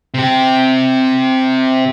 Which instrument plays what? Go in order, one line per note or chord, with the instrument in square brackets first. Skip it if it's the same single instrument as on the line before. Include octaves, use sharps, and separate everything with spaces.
[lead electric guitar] C3 G4